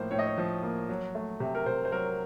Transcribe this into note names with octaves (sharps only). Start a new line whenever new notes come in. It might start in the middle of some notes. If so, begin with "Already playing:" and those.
Already playing: A2 F3 A#3 C5
A2 C#5
D#5
C#5
F3
A#3
F#3
A3
C3
A#4
C3 C5
C5
F#3 A#4